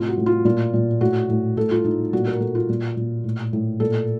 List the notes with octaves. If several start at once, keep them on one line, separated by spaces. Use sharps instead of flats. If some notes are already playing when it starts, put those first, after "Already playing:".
Already playing: A2 C3 F4
F#4
A2
F4
A#2 F4
A#2
A2 F#4
A2
A2 A4
F4
A2 D#4
A#2 F#4
A#4
A#2 A4
F4
A#2
A#2
A2
A2
A#2 A4